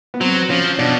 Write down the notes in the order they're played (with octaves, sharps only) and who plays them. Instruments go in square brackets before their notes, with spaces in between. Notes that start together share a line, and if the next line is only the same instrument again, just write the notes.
[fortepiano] B3
[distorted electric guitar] F#3 [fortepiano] C4
[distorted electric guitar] F3 [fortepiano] C#4
[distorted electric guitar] B2 [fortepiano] D4